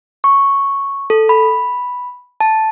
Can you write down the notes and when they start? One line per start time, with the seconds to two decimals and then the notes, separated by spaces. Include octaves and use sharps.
0.24 C#6
1.10 A4
1.29 B5
2.41 A5